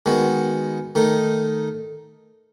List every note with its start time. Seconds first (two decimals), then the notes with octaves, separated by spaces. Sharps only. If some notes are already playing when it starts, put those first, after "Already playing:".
0.06 D#3 G#3 B3 F#4
0.95 D#3 A3 D#4